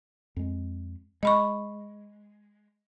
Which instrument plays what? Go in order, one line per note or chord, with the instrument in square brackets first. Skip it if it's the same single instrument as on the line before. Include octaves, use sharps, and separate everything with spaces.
[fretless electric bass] F2 G#3
[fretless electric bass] G#3 [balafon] D#5 B5 C#6